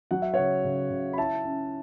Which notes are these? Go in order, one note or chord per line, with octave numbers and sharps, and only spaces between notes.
F#3 F#5
E5
C#3 C#5 F#5
C#3
C#3
B5
E4 E5 A5
C#4